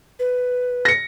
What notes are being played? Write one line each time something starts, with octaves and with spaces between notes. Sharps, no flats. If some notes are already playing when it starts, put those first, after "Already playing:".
B4
A#6 C#7